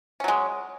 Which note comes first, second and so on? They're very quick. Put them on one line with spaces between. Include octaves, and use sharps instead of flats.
C#4 F#3 G#3